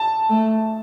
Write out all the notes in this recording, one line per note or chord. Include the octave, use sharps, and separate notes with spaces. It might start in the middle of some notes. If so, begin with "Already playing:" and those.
Already playing: A5
A3